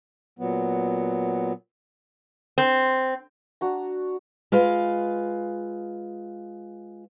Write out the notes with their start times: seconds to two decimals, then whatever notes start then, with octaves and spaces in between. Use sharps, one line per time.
0.39 A#2 F#3 B3
2.58 C4
3.61 D4 F#4 A#5
4.52 G#3 F4 B4 F5